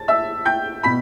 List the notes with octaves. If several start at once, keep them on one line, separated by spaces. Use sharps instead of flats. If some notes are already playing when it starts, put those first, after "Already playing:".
Already playing: A5 A6
E5 E6
G5 G6
B2 B5 B6